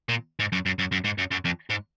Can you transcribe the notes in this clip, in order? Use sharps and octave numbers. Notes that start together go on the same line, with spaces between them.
A#2
G#2
F#2
F#2
F#2
F#2
G#2
F#2
F#2
F2
G#2